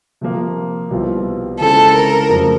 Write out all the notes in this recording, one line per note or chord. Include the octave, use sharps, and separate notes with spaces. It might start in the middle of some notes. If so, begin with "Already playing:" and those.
C3 F3 A#3
C2 B2 G3 C4 F4
C#3 E3 G#3 C4 F4 A4
A#4
F2 C#3 F#3 A3 C4